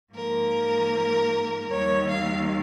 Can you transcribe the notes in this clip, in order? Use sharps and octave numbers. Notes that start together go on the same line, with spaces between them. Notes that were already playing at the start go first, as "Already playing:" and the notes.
G#2 F3 A#3 A#4
D#2 D#3 G3 C#5
F5